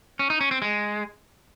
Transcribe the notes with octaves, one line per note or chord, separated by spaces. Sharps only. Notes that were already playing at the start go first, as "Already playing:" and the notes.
C#4
D#4
C#4
C4
G#3